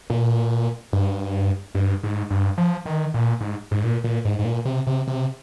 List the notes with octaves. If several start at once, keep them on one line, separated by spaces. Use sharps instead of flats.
A#2
G2
G2
G#2
G2
F3
D#3
A#2
G#2
G#2
A#2
A#2
G#2
G#2
A#2
C3
C3
C3